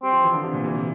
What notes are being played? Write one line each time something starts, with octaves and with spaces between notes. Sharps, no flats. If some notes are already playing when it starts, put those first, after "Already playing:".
G3 C4
F3
E3
D3
C3
A#2
E3
C3